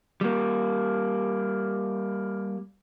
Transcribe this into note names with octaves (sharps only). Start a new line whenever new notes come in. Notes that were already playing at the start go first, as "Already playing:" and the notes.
G3 A#3